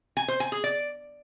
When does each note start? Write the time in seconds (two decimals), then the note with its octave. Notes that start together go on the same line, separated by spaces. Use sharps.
0.17 G#5
0.28 C5
0.40 G#5
0.52 G#4
0.64 D5